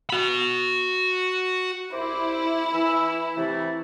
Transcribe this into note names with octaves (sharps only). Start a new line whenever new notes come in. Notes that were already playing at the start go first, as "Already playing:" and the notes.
F#4 B5
C2 E4 C5 D6
E3 E6
C3 E3 A3